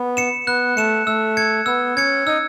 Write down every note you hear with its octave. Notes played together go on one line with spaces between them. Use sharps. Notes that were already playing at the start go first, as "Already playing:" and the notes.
Already playing: B3
C#7 E7
B3 F#6
A3 C#7 E7
A3 E6
G#6 C#7
B3 E6
C#4 G#6 C#7
D#4 E6